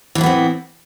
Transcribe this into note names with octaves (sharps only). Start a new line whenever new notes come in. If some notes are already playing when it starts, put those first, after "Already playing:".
A2 E3 B3 C4 D4